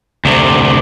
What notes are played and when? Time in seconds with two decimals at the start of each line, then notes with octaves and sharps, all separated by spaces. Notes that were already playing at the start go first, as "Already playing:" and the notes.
0.25 D2 C3